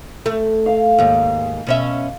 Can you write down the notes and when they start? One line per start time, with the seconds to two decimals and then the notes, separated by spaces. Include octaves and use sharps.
0.26 A3
0.66 F5
0.98 D#2 G#2
1.67 B2 C#4 E5